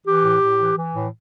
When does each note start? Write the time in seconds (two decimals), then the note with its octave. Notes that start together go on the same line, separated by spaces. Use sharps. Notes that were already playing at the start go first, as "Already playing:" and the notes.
0.05 E3 G4
0.23 A2
0.41 A2
0.59 E3
0.77 E3
0.95 A2